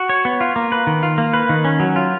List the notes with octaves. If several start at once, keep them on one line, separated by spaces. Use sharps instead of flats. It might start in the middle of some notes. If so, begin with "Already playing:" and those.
Already playing: F#4
C#5
B3
F4
A#3
B4
D#3
F4
A#3
B4
D#3
C#4
F#3
F4